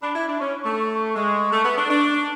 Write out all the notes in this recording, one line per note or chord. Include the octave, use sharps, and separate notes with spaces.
D4 B5
E4
D4
C#4 C#6
A3
G#3 C#6
A3
B3
D4
D4 C#6